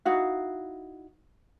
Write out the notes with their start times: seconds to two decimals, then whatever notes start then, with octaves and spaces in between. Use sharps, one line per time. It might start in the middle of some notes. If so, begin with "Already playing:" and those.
0.05 D#4 E4 F#4 F5